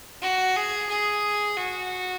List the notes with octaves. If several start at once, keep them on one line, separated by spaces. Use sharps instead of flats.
F#4
G#4
G#4
F#4